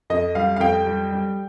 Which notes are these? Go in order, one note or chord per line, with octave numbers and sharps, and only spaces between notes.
F2 D#5
G3 F5
F5
F2 G5
G3
G3